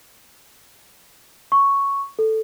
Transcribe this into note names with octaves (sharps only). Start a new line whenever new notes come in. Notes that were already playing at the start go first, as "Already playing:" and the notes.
C#6
A4